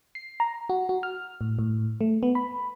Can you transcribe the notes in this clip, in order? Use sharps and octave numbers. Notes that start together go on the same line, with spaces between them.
C7
A#5
F#4
F#4
F6
A2
A2
A3
B3
B5